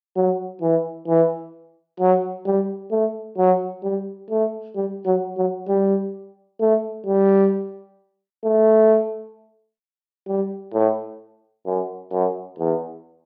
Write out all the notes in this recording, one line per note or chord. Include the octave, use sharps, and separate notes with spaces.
F#3
E3
E3
F#3
G3
A3
F#3
G3
A3
G3
F#3
F#3
G3
A3
G3
A3
G3
A2
F#2
F#2
E2